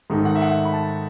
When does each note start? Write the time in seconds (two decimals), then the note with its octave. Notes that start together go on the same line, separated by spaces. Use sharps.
0.10 G#2 D#3 A3
0.25 F#5
0.35 E5
0.42 F#5
0.65 B5
0.73 A5